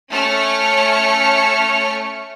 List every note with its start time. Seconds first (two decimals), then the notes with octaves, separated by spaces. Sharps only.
0.11 A3 C#4 C#5 F6 C#7